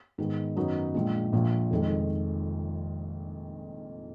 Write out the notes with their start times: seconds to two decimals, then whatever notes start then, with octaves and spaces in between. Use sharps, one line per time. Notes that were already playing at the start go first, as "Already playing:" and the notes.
0.18 G#2 D#3 G#3 B3
0.56 F#2 D#3 F#3 B3 D#4
0.94 A#1 A#2 G#3
1.33 A#1 A#2 F3
1.71 F1 F2 D#3 G#3